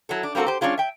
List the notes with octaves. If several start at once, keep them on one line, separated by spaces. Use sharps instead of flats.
F#3 E4 A4
D4
G3 A#3 C4 F#4 A4
G4 C5
G3 C#4 D4 F4 G#4
E5 G5